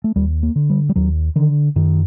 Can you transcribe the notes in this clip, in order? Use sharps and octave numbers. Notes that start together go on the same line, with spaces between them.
A3
D#2 G3
A#3
D3
G3
G3
D#2 F#3
D3 D#3
F#2 D#3